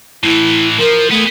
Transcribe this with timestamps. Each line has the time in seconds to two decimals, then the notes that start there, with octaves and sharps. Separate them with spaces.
0.24 A2 E3 E4
0.79 F3 A#4
1.11 A3 B3 G#4